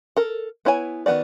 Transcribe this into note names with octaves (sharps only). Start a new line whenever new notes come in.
A4 A#4
B3 E4 C#5 G#5
D#3 A3 B3 F#4 D5